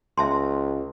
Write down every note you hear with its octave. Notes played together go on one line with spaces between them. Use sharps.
C#2 E5 A5 C6